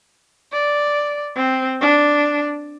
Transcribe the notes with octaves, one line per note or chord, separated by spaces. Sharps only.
D5
C4
D4